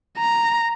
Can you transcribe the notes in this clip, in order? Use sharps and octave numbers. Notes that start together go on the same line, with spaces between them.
A#5